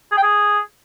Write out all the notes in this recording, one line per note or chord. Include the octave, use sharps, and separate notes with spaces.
G#4
G5
G#4